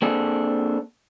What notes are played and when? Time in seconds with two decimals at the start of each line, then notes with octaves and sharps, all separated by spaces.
0.02 A#3 C4 D4 G#4 A4